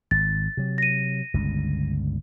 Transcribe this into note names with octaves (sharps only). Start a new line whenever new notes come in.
G#1 A6
C3 F#3
A#6 D#7
G1 C#2 D3